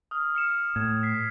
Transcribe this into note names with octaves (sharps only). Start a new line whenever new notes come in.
D#6 F6
F6 C#7 E7
A2 G#6 E7
B6 C7